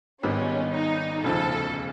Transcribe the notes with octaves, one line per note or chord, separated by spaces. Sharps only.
G#1 G#2 D#3 G3 B3 C#4
D#4
E1 D2 C#3 F3 A4